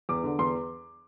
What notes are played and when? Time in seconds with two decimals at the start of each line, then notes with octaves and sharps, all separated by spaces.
0.09 E2 D6
0.24 D3
0.39 E2 C6